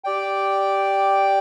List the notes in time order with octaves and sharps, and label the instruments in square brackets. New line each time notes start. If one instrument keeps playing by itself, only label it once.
[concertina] G4 D5 G5